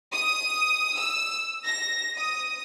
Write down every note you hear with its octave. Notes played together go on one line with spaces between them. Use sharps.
D#6
E6
A#6
D#6